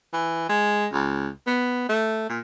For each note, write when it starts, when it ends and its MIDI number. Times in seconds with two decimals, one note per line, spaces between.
0.13 0.46 52
0.49 0.86 56
0.93 1.29 37
1.47 1.88 59
1.89 2.25 57
2.29 2.40 46